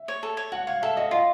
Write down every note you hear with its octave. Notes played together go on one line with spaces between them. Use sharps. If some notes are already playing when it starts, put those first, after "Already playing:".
Already playing: E5
C#5
A4
C#5
F#4 F#5
C#5 F5
A4 E5
F#4 D#5
F4 D#5